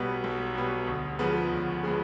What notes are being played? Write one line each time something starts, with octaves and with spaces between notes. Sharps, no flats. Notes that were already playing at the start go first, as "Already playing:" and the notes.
Already playing: B1 B2 G3 B3
B1
B2 G3 B3
D2
C#3 F3 G#3 B3
D2
C#3 F3 G#3 B3